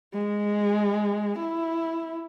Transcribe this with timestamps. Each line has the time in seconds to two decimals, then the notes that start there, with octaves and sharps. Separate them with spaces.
0.13 G#3
1.39 E4